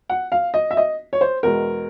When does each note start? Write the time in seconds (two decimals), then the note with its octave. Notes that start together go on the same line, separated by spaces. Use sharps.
0.10 F#5
0.32 F5
0.54 D#5
0.71 E5
0.77 D#5
1.13 C#5
1.21 C5
1.43 E2 B2 G#3 A#4